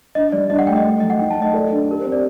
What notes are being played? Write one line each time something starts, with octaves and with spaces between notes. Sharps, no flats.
D4 D#5
G3 D5
D4 D#5
F#5
A3 G5
D#5
A3
F#3 D#5
F#5
D#4 G5
A5
A3
D#5
A4 D5
D4
G4 A#4
C4 C5
D5